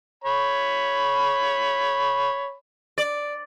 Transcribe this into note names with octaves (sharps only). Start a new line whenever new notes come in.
C#5 B5
D5